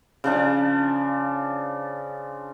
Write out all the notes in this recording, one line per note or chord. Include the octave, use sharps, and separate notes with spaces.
C#3 F3 D4